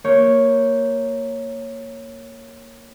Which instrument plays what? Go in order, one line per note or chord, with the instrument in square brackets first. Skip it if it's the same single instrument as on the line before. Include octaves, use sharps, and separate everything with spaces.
[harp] A#3 C#5 G6